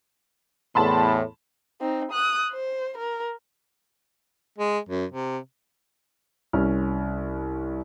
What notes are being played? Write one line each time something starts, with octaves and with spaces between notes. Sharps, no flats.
E2 A2 A5 B5 C6
C4 D#4
D#6 F#6
C5
A#4
G#3
F#2
C3
C2 C#4 F6